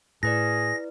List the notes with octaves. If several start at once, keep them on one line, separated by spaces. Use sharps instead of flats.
A2 E4 G#4 B4 D5 A#6